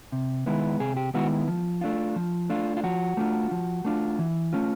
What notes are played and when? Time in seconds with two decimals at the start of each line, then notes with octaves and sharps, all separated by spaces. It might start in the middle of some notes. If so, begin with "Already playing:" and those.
0.12 C3
0.46 D#3 G#3 B3 E4
0.80 C3 G#4
0.97 G4
1.14 D#3 G#3 B3 E4 F#4
1.48 F3
1.81 A3 D4 F4
2.16 F3
2.49 A3 D4 F4
2.77 F4
2.84 F3 F#4
3.17 A3 D4 F4
3.51 F3
3.85 A3 D4 F4
4.19 E3
4.53 A3 C#4 F4